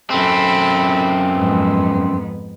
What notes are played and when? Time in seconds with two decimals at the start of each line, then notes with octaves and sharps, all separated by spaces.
0.10 F#2 C4 A4 B5
1.34 F2 G#2 B3